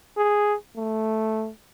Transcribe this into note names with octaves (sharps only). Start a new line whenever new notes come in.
G#4
A3